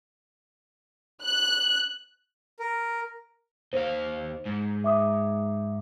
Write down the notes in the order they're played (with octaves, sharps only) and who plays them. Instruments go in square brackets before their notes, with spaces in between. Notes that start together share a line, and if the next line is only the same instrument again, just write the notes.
[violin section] F#6
[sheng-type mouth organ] A#4
[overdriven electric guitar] D#2 F5 [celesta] C5
[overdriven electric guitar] G#2
[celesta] E5 D6 D#6